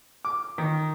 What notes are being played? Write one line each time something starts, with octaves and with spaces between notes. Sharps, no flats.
D6
D#3